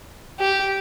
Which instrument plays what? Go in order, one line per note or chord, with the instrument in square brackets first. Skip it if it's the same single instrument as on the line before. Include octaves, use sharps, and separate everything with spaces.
[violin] G4